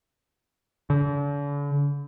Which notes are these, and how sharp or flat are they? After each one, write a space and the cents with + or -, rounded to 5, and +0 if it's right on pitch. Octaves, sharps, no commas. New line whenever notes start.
D3 -40